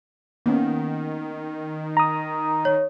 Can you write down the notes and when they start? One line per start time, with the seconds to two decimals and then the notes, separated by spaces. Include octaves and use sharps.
0.46 D#3 A#3 B3 C#4
1.97 A#5 D#6
2.65 C#5